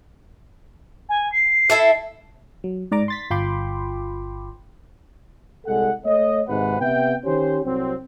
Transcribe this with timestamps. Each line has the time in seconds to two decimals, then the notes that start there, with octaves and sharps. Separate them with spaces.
1.09 G#5
1.32 C7
1.70 E4 A4 E5
2.64 F#3
2.92 G#2 D5 A#5 D6
3.08 C6 A6 B6
3.31 G1 F4 G5 B5 C6 D6
5.66 C2 G#3 A4 F#5
6.05 A3 C#5 D#5
6.48 G#1 G#2 C3 B4 F#5
6.80 C3 B3 E5 G5
7.25 D#3 C#4 G4 C5
7.65 C2 F#3 C4